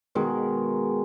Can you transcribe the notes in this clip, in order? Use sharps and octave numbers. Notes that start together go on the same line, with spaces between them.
B2 D#3 G#3